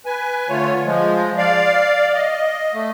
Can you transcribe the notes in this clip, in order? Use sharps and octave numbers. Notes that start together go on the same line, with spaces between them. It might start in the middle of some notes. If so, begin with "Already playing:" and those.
B4 G#5
D3 A3 F4 C#5
F3 G#3
D5 F5
D#5
A3